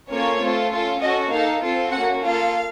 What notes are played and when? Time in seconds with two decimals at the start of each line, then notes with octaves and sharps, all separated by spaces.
0.10 A#3 C#4 F4 A4 C#5
0.40 A3 C4 F4 A4
0.70 C#4 F4 A4
1.01 C#4 F#4 A4 D#5
1.30 A#3 D#4 A4 F5
1.61 C4 F4 A4
1.92 A#3 C#4 F#4 F#5
2.22 A#3 F4 A4 F5